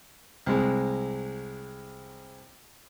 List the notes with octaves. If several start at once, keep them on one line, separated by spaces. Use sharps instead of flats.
C2 G#3